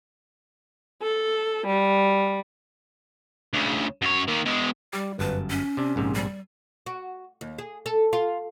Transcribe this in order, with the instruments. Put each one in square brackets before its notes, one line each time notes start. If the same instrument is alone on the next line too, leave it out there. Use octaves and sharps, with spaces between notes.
[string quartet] A4
G3
[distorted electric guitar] D2 C#3
F#2 C#5
D#3 A#3
B2 G#3
[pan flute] G3 [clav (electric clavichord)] G4
[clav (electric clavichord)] G1 F#2 A5 [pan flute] B4
[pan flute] C#4
[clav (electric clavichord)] C3 D4
A#1 G#2 C3
[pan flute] G3
[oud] F#4
D#2
G#4
A4
F4